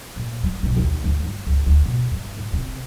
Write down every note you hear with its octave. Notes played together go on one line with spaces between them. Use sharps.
A#2
G3
B1
D#2
D2
G2
C#2
D2
B2
G2
A2
C3